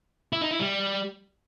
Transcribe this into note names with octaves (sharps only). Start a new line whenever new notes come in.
E4
D#4
E4
G3